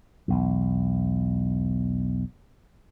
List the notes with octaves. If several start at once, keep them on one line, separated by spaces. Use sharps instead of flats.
B1 E2